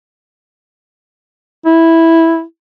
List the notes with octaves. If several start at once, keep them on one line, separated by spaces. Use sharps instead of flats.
E4